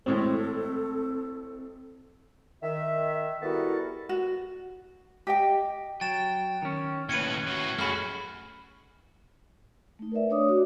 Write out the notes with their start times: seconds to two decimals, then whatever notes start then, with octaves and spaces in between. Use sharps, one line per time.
0.06 G#1 A2 G#3 C4 A4
2.62 D#3 E5
3.41 G3 B3 E4 F#4 A4 A#4
4.09 F#4
5.27 G4 D#5 G5
6.01 F#3 G5 A6 E7
6.62 D#3 C#4
7.09 D#2 A2 C#4 B4 G#6 C#7 D#7
7.47 A2 F#4
7.79 F#2 A3 C#4 F#4 G#4 B5 F6
9.99 A3 D#4
10.12 A#4 B4 D5 E5
10.29 A3 D4 C#5 D5 D6 D#6
10.49 F#4